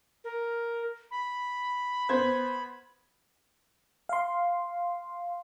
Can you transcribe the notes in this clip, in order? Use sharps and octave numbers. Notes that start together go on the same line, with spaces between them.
A#4
B5
B3 C5 G#6
F5 C6